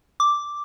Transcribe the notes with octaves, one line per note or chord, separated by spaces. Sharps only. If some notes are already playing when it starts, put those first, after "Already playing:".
D6